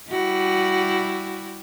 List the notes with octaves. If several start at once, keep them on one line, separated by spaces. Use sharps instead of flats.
G3 E4 F#4